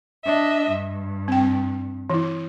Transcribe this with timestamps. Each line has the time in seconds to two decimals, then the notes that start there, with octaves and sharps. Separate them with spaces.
0.24 D4 D#5 E5
0.70 G2
1.28 C4 G5
2.10 E3 E4